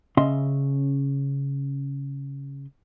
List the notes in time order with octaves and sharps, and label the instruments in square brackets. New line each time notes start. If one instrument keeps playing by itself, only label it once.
[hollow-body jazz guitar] C#3 C#4 D#5 E5 C6